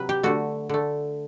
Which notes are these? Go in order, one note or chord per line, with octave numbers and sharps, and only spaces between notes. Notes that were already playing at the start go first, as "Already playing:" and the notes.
Already playing: C3 F#3 B4
G4
D3 A3 F#4
D3 A3